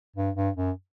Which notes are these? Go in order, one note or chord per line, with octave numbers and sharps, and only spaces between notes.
G2
G2
F#2